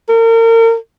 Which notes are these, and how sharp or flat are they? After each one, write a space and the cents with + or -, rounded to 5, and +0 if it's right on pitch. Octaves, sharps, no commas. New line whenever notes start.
A#4 -35